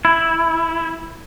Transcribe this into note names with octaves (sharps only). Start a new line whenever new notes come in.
E4